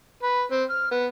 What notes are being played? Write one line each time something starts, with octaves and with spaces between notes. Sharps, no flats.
B4
C4
F6
B3